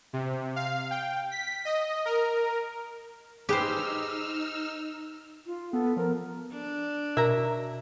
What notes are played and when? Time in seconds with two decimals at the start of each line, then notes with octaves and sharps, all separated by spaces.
0.13 C3
0.56 F5
0.91 G5
1.31 B6
1.65 D#5
2.05 A#4
3.49 D#4 G4 G#4 B4 C5 E6 F6
5.46 F4
5.73 B3 A4
5.97 F3 A#4
6.52 D4
7.17 B2 A#4 E5 A#5